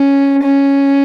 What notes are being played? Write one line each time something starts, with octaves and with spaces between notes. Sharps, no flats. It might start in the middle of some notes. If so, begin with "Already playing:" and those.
Already playing: C#4
C#4